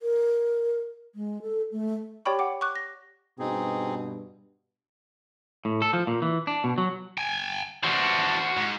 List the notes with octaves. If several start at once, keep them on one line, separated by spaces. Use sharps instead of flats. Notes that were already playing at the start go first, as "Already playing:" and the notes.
A#4
G#3
A4
A3
G4 C#5 D5 G5 B5 C#6
F#5 G5 D6
C#6 D6 F#6
A#6
G2 B2 C4 D#4 G#4
A2
A4
F3
A#2
E3
D4
B2
F#3
G5 G#5
E3 D4 F#4 C5
G#2